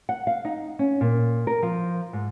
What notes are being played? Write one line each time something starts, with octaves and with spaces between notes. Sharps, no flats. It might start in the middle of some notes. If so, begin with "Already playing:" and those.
F#5
F5
D#4
C#4
A#2
A#4
F3
G#2